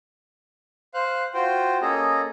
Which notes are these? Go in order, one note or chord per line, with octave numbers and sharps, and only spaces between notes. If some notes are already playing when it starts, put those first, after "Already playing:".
C5 F5 F#6
F4 F#4 C5 G5
A#3 C#4 G#4 A4 D#5 A#5